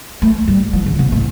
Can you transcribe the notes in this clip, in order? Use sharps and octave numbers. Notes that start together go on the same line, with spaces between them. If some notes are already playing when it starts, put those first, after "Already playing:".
A3
G3
F3
D3
C3
A2